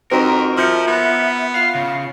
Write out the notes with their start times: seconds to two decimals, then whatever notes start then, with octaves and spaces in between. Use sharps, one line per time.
0.11 F2 C4 D#4 F#4 A#4 A#5
0.57 F3 E5 F6 G6 C#7
0.87 B3
1.55 F4 F5
1.75 C#3